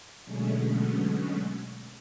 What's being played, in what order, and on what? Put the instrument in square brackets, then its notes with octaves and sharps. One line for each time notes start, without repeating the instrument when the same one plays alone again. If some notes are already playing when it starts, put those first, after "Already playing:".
[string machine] B2 D3 F#3 G#3 A3 C#4